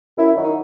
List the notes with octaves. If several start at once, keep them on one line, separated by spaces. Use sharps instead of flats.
F#2 E4
D#3 F#3
D#4